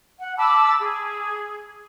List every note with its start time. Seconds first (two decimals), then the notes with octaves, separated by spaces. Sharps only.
0.19 F#5
0.37 A5 B5 D6 E6
0.80 G#4